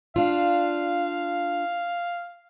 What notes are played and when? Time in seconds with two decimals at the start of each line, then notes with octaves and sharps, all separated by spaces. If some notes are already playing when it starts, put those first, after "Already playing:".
0.16 D4 F4 F5